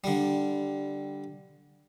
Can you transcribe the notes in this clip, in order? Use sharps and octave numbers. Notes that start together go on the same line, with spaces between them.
D3 G3